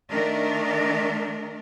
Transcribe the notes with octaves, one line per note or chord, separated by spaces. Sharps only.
D#3 A3 D4 A#4